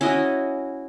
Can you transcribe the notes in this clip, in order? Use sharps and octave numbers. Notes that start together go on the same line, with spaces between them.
C#4 E4 F#4 D#5